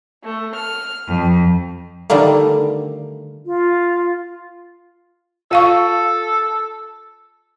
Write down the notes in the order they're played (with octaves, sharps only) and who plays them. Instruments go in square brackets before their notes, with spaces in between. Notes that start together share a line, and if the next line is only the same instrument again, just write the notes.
[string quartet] A3
F6
F2
[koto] D3 D#3 G3 A3 A#3
[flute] F4
[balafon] F4 F5 C#6 [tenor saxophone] A4